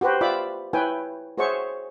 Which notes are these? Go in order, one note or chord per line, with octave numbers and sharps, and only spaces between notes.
F#4 G4 B4 C5 G5
F4 D5 E5 B5 D6
E4 B4 C#5 G5 G#5
F#4 G#4 C5 C#5 E5 C#6